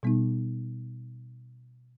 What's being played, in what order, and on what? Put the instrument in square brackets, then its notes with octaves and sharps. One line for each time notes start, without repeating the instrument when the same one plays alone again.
[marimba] B2 G3 B3 D#4